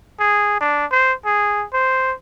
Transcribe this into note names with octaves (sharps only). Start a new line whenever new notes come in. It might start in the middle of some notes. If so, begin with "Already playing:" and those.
G#4
D4
C5
G#4
C5